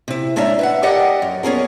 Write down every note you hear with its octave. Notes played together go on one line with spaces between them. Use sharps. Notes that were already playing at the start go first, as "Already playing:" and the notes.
C3 E4
A2 G#3 C#4 D4 E5 A#5
B4 E5 F#5
G4 A4 A#4 D5 D#5 F#5
F#2
B3 C#4 G#4 A#4